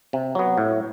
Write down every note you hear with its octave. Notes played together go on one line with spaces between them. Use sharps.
C3
F#3 B3
A2